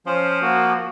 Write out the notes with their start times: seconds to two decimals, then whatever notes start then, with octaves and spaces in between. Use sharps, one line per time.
0.06 F3 C#4 C5
0.41 A#3 F#4